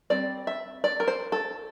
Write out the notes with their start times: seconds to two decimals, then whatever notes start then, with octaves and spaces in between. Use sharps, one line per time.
0.10 G3 C4 D5
0.47 E5
0.84 D5
1.00 A#4
1.08 C5
1.32 A4